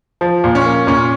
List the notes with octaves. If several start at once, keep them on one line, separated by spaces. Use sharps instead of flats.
F3
A#2
C#4
A#3
A#2 C#4